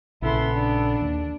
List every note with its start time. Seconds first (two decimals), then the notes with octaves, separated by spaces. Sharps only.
0.22 A#1 C#3 B3 E4 A4 C6
0.54 D4
1.01 D#2